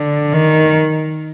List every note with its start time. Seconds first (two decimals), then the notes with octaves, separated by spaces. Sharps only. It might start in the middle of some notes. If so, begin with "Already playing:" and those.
Already playing: D3
0.33 D#3